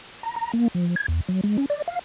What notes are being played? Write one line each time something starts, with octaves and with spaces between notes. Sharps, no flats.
A#5
A#5
A#3
F3
G#6
E2
F#3
G#3
C#4
D5
F5